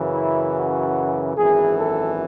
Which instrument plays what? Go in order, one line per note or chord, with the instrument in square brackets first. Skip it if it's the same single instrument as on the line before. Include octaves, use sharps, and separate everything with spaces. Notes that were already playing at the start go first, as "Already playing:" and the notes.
Already playing: [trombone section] F#2 C#3 E3
E4
F#4
G#1 F#2 E3 G#4
A4